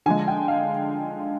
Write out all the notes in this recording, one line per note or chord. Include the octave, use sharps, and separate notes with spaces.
D3 F3 G#3 G#5
G5
F5